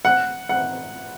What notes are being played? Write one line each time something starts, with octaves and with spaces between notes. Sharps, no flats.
F#5
F#5